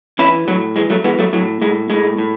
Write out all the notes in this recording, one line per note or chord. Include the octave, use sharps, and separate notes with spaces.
E3 C#4 E4
A2 F#3
E3 G#3
F#3 A3
E3 G#3 B3
F#3 A3
A2 F#3
A2 G#3
A2 G#3
A2